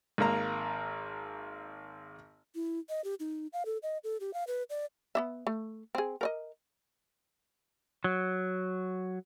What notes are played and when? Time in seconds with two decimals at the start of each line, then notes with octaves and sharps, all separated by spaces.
0.18 G#1 A#3 A#5
2.55 E4
2.89 D#5
3.04 G4
3.20 D#4
3.53 F5
3.66 A4
3.83 D#5
4.04 A4
4.20 G4
4.34 F5
4.47 B4
4.70 D5
5.15 B3 D4 E5
5.47 A3
5.95 C4 G#4
6.21 A#4 D5 D#5
8.04 F#3